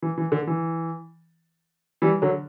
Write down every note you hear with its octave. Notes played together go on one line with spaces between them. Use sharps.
E3
E3
D3
E3
E3 G3
D3 F#3